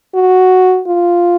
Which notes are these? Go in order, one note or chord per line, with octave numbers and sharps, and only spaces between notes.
F#4
F4